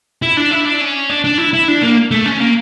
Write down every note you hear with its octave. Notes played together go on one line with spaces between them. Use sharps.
E4
D4
E4
D4
C#4
D4
D4
E4
E4
D4
A#3
A3
C#4
A#3